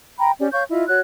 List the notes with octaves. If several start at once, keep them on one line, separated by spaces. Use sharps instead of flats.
G5 A#5 B5
C#4 G4 D5
C#5 F5 C#6 G6
E4 F4 D#5 E5
F#4 C#5 F#6